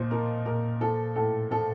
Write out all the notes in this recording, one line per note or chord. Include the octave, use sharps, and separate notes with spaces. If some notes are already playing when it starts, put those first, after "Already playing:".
Already playing: A#2 F3 C5 D#5
F3 A#4
A#2 A#4
F3 A4
A2 A4
F3 A4